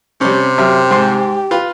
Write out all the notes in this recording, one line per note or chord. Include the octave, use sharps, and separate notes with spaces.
C3 G3 C#4
F#2 G4 E5 F6
G#2 C6
F4 B4